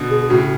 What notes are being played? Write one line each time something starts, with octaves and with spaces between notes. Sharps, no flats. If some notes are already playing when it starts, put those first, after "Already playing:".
Already playing: B2 D3
G#4
A2 C#3 F#4